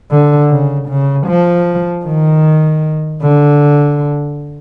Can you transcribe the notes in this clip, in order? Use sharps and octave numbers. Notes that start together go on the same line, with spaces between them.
D3
C#3
C#3
F3
D#3
D3